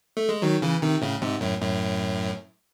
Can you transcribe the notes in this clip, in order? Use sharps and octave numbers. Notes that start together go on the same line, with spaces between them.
A3
G#3
D#3 F#3
C#3 E3
C3 D#3
A2 C#3
G#2 C3
F#2 A2
F#2 A2